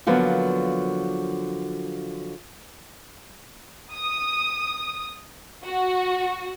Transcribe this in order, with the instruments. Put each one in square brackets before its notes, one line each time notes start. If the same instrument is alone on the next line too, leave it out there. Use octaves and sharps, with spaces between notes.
[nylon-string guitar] D3 F3 F#3 A#3 B3
[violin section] D#6
F#4